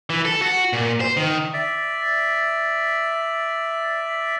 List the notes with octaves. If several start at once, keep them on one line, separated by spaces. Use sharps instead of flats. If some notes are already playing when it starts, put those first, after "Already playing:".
E3
A4
F#4
A#2
C5
D#3
D5 E5